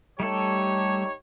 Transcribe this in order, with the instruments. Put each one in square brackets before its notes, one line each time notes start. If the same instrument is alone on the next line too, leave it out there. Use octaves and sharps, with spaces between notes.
[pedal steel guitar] G3 A3 A4 [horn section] D#4 G4 C#5